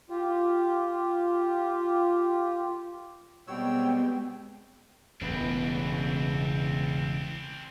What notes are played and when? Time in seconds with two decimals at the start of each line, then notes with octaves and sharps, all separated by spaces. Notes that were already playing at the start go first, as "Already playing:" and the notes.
0.10 F4 G4
3.48 B2 G3 G#3 B3 C4 C#5 G5 E6
5.21 E1 A1 C#3 B3 C4 D4 B4